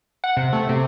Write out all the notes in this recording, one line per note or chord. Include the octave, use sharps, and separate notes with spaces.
F#5
C3
A3
C3